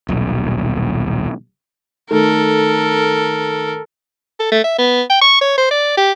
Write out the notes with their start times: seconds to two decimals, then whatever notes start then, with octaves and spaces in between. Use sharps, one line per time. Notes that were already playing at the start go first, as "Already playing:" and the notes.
0.09 D#1 B1
2.11 D#3 A3 A4 A#4
4.40 A4
4.52 A3
4.64 E5
4.78 B3
5.10 G5
5.21 C#6
5.41 C#5
5.58 C5
5.71 D5
5.97 G4